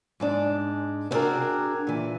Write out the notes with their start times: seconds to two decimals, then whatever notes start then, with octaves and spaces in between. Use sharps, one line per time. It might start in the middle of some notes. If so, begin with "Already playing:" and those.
0.20 G#2 G#3 D4
1.11 B3 C4 D4 F#4 G#4 A#4
1.87 A#2 E3